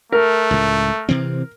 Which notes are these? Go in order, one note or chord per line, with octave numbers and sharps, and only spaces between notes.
A3 A#4
C#2 A2
C3 E3 C4